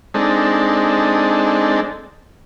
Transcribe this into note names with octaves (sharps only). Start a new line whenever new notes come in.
G#3 C4 D4 D#4 A4